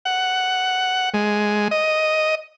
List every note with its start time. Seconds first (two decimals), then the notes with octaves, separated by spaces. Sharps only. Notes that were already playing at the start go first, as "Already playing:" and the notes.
0.05 F#5
1.14 G#3
1.71 D#5